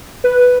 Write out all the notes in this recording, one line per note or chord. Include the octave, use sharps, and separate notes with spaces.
B4